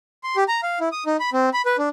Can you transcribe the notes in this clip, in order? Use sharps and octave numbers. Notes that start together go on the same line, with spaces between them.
C6
G4
A#5
F5
E4
D#6
D#4
B5
C4
B5
B4
D4